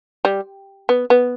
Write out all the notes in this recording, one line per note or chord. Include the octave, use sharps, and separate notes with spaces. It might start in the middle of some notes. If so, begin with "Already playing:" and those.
G3
B3
B3